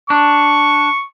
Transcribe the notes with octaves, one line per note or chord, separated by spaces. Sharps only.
D4 C#6